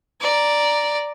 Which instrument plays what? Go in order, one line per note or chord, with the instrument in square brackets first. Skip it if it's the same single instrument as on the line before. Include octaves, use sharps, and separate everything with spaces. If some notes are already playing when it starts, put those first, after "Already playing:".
[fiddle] D5 A#5